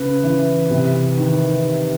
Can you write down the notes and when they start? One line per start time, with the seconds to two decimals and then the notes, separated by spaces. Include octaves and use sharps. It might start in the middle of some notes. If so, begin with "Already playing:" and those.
Already playing: C#3 B4
0.24 E3
0.70 C3
1.17 D#3